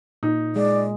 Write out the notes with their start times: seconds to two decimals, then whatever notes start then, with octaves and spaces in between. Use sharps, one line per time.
0.23 A#2 D#4
0.56 G#3 D5